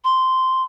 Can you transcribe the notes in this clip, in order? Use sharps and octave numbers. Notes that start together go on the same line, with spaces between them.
C6